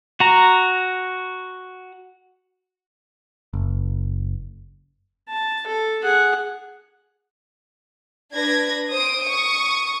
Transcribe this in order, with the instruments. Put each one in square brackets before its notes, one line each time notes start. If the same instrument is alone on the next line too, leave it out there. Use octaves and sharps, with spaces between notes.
[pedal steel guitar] F#4 A#5
[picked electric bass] F#1
[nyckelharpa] A5
A4
G#4 F#5
[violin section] D4 B4 G#6 A#6
C5 D#6 D7
C#6 D#6